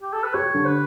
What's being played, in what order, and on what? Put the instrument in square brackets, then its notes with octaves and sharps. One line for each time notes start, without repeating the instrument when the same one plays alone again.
[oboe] G4
A4
B4
[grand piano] G4 [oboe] C#5
[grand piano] D3
[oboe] B4